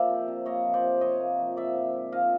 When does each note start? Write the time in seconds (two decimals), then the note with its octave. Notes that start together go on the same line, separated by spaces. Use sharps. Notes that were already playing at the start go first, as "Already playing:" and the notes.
Already playing: F3 A#3 C5 D5 E5
0.09 C3
0.28 C3
0.46 A#3 C#5 D#5
0.65 F3
0.73 C5 D5
0.83 C3
1.01 C3 C#5 D#5
1.20 A#3
1.39 F3
1.57 G#2 D5 E5
1.75 G#2
1.93 G#3
2.12 F3 D#5 F5